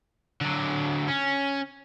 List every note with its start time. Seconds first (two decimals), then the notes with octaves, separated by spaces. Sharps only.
0.41 D3 F#3
1.08 C#4